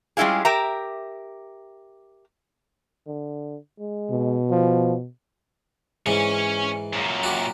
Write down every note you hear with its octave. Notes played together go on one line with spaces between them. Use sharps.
G3 G#3 C#4 E4 F4 G#4
G4 A#4 E5 A#5
D3
G#3
B2
F3
G#2 E3 C#5 G#5
F#2 A#2
F#4 G4